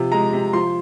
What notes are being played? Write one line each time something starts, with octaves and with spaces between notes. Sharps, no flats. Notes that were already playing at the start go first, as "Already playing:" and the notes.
Already playing: C3 F3
G#3 A#5
C3
F3 C6